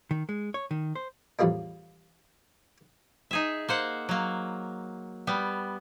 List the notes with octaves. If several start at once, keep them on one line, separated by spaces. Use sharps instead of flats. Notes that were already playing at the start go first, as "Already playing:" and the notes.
D#3
G#3
C#5
D#3
C5
E2 A2 F3 G3 A#3 D4
D#4 G#4 E5
A#3 C5 F#5
F#3 A#3
G3 B3